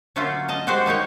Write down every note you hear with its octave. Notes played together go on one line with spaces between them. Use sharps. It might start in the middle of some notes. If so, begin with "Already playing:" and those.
D3 F#3 A3 A#3 C#4 F4
D#5 A5 A#5
G3 G#3 F#4 G4 C5
A#3 D#4 G4 C#5